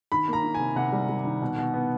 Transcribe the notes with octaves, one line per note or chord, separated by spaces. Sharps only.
D#3 B5
A#3
A#5
D#3
G#5
C3
C3 F#5
G3
G3
D#3
B2
B2
B3